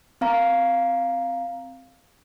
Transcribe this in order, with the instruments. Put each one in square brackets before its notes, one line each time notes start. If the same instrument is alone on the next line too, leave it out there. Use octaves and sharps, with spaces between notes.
[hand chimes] C4 F5 A#5